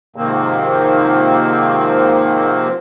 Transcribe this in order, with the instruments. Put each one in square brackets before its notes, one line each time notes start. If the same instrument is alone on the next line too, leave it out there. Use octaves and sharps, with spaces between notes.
[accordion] G#2 C3 D#3 F3 A#3 C4